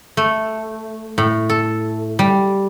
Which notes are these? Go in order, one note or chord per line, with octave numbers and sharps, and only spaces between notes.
A3
A2
A4
G3